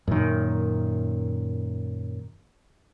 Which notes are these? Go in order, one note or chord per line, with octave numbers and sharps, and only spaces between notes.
F#2 A#2 D#3